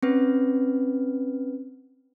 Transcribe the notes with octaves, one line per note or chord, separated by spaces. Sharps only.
C4 C#4 B4